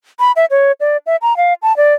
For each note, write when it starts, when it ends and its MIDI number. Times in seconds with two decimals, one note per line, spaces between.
0.20 0.32 83
0.36 0.45 76
0.51 0.72 73
0.80 0.97 74
1.06 1.16 76
1.22 1.36 82
1.37 1.54 77
1.62 1.76 81
1.77 1.94 74